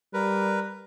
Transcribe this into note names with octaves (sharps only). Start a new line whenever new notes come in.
G3 A#4 B4